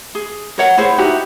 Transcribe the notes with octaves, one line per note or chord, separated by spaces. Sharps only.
G#4
A#4 C#5 F#5
E4 G#4 C5 C#5
D#4 E4 F#4 G4